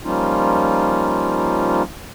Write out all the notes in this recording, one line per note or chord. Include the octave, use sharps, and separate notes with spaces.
F3 G3 A#3 C#4 D#4 F4